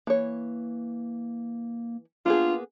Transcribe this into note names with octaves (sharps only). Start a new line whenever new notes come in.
E3 A#3 C#5
A#3 B3 D4 F4 G#4